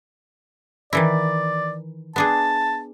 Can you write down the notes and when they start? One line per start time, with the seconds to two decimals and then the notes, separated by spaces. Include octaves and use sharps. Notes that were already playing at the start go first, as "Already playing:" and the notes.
0.93 D#3 E3 E4 D5
2.16 B3 D4 G#4 A5